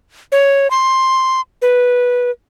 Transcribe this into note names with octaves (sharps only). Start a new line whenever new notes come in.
C#5
C6
B4